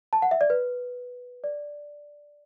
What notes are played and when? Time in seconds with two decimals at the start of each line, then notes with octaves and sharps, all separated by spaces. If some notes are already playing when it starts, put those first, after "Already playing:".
0.13 A5
0.22 F#5
0.31 E5
0.41 D5
0.50 B4
1.44 D5